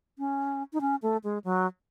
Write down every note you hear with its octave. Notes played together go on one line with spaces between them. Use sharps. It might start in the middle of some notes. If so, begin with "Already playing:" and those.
C#4
D#4
C#4
A3
G#3
F#3